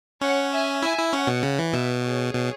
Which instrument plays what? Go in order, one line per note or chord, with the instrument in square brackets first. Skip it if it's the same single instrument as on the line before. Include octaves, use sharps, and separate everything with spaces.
[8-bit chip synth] C#4 [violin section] C#5 F#5
[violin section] E5 G#5
[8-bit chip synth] E4 [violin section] E5 G#5
[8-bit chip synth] E4
[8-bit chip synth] C#4 [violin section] C#5 F#5
[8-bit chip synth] B2
C#3
E3
[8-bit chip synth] B2 [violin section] B4 E5
[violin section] G#4 C#5
[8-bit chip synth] B2